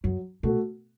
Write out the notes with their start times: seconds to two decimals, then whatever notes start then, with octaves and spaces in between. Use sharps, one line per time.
0.04 F#2 F#3
0.43 B2 A3 F#4 A4